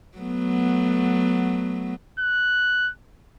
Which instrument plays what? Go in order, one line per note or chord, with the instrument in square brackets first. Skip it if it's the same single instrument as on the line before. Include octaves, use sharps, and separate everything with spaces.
[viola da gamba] F#3 A3 B3
[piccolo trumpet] F#6